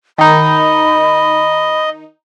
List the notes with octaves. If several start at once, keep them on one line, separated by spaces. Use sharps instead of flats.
D#3 D#4 D#5 B5